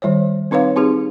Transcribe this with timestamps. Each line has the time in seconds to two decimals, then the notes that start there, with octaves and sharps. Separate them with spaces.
0.02 D#3 G3 C5 C#5
0.51 C4 D#4 B4 C#5 F5
0.76 C4 D#4 G4 G#4